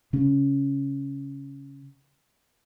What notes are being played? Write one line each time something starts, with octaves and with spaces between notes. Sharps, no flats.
C#3 C#4